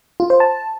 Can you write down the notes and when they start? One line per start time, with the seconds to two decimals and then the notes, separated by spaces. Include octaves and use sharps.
0.20 F4
0.30 C5
0.40 A5